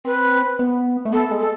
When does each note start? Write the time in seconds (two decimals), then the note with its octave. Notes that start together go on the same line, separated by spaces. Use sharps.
0.05 C4 B4
0.59 B3
1.05 A3
1.13 B3 A4
1.31 G#3
1.40 A4